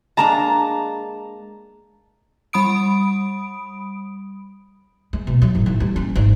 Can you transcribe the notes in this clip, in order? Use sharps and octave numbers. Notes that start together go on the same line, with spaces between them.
G#3 A#3 D4 A5 A#5
G3 B5 D#6 D7
G#3
B2
F#3
A2
D#3
G3
C#4
G#1